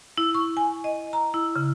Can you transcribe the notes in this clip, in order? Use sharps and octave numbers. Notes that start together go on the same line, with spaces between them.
E4
C#6
G#5
D#5
A#5
E4
C#3